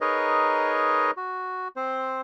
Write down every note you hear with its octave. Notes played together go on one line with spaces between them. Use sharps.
D#4 G#4 A#4 B4 C#5 D#5
F#4
C4 C5